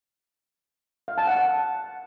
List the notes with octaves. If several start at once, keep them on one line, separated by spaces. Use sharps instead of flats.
F5
A5
F#5